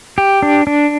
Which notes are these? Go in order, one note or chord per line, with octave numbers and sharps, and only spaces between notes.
G4
D4
D4